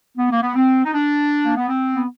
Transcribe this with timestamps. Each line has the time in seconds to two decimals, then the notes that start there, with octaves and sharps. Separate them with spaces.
0.17 B3
0.30 A#3
0.42 B3
0.55 C4
0.85 D#4
0.92 D4
1.44 A#3
1.56 B3
1.68 C4
1.94 B3